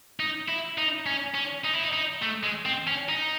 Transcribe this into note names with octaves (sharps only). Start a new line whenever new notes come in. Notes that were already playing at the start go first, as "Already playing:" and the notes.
D#4
E4
D#4
C#4
C#4
D#4
E4
D#4
D#4
A3
G#3
C4
C#4
D#4